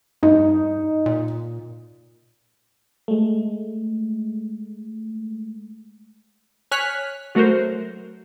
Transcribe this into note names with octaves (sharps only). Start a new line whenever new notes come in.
G2 D#4
A#2
G#3 A3
C#5 G#5 F6 F#6 B6
F#3 A3 F#4 A#4 C5